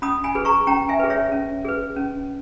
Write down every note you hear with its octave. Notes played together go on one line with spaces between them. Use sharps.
C#4 B5 D#6
G#5 B5
G#4 B4
A#5 C#6
C#4 G5 A#5
E5 G#5
G#4 B4
C#5 E5
C#4
G#4 B4
C#4